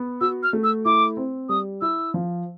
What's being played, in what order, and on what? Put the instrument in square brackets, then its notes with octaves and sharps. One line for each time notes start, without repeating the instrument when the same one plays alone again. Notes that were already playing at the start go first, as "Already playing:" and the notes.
Already playing: [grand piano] B3
[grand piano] F#4 [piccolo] E6
[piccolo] F6
[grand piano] A3
[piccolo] E6
[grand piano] E4 [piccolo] D6
[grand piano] C4
[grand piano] G3 [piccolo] D#6
[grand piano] E4 [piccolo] E6
[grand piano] F3